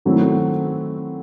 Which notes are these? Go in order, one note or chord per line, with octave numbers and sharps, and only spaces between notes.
D#3 F#3 A3 C4 E4